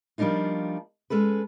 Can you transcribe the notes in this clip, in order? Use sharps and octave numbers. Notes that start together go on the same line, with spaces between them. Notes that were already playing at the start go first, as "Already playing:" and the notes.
F3 G3 A#3 D4 D#4 F4
G#3 C#4 A4 B4